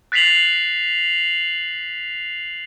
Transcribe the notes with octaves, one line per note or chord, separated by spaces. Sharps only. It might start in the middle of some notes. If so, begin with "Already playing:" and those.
F#6 A6 B6 C7 F7 F#7